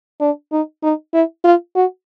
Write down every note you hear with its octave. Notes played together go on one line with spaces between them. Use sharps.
D4
D#4
D#4
E4
F4
F#4